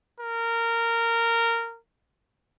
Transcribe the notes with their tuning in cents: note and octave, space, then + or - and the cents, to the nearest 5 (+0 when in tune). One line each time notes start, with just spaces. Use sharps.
A#4 -15